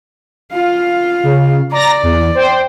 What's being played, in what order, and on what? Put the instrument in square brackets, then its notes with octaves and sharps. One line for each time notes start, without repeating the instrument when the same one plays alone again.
[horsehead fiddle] F4 F5
[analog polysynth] C#3
[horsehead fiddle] D5 [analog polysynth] A#5 A6 A#6
[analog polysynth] E2
C5 G5